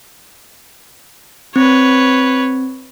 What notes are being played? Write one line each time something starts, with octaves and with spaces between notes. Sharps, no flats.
C4 B4 C#5